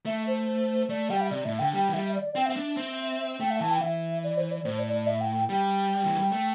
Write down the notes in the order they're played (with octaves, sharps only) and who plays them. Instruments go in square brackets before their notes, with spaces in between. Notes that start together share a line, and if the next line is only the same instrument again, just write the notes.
[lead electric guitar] A3 [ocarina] E5
[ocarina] C5
[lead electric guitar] A3 [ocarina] D5
[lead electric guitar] G3 [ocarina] G5
[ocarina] E5
[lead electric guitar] C3 [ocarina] D5
[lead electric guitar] A2 [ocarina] E5
[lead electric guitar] D3 [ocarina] G5
[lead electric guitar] G3 [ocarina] G5
[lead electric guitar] E3
[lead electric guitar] G3 [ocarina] E5
[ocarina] E5
D5
D5
[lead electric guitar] C4 [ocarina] G5
[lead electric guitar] C4 [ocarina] E5
[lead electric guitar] D4
C4
[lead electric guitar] A3 [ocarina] G5
[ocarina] E5
[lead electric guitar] E3 [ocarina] A5
[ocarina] G5
[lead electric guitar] E3 [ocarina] E5
[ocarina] D5
C5
D5
[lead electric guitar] A2 [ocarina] C5
[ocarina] D5
D5
E5
G5
G5
[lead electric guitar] G3 [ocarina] G5
[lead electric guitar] E3
G3
A3